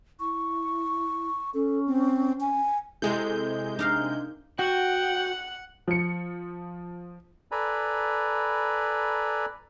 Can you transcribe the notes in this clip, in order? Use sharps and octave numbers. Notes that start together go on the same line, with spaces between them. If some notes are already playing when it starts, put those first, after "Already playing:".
E4 C#6
C#4 A4
C4
G#5
C3 G#3 E4 G#4 A4 G6
D4 D#4 A#4 F5
F#4 F#5 G5
F3 C#7
A4 B4 D5 G#5 A#5 B5